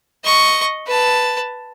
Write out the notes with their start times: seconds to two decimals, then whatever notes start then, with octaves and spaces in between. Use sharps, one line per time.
0.24 D#5 C#6
0.87 B4 A5